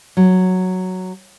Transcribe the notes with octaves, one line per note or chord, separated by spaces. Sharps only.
F#3